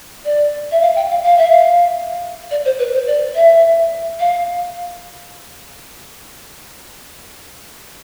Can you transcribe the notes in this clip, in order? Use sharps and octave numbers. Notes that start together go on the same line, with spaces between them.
D5
E5
F5
G5
F5
F5
E5
F5
D5
C5
B4
C5
D5
E5
F5